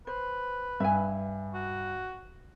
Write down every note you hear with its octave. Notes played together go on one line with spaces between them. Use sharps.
B4 C5
G2 E5 G#5
F#4